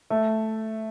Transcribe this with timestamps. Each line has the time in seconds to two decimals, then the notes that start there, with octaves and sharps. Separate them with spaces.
0.10 A3